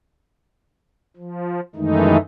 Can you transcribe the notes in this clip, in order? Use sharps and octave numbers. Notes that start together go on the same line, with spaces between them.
F3
F#2 D#3 E3 G#3 A3 D#4